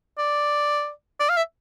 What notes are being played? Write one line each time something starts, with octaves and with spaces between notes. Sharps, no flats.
D5
D5
F5
E5